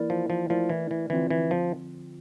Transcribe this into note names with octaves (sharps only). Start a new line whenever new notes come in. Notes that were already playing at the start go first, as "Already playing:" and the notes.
Already playing: E3 A#3 E4 A#4 D5
F3
F3
F3 A3 E4 A#4 D5
E3
E3
D3 E3 F3 C4 F4
E3
F3